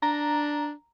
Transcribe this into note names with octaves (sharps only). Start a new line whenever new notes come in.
D4 A#5